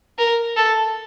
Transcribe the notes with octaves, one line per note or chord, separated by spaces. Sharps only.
A#4
A4